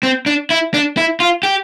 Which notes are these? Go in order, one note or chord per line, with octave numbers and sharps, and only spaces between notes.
C4
D4
E4
D4
E4
F4
G4